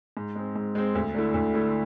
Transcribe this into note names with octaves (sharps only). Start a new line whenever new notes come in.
G#2
G#3 C4
G#2
G#3 C4
D2
D3 A3 E4
D2
D3 A3 E4